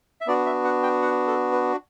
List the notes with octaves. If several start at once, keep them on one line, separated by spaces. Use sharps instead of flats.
E5
B3 D4 F#4 D5
E5
F#5
G5
F#5
A4
B4